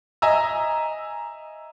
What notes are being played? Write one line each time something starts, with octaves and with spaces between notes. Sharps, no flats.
D#5 E5 G#5 A#5 E6